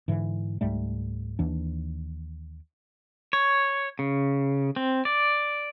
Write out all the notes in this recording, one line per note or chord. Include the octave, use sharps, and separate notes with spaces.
G#2 D3 E3
C#2 G#2 G3 A3
D#2 E3 D4
C#5
C#3
C4
D5